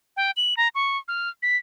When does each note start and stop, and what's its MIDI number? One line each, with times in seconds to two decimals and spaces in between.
0.17 0.31 79
0.37 0.54 102
0.57 0.68 82
0.75 0.98 85
1.08 1.29 89
1.42 1.57 95